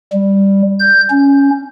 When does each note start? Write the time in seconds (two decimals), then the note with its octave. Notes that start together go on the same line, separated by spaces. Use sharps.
0.12 G3
0.79 G6
1.10 C#4